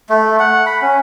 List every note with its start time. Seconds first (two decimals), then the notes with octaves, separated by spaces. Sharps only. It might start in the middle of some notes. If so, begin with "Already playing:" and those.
0.10 A3
0.39 F#5
0.66 B5
0.82 C#4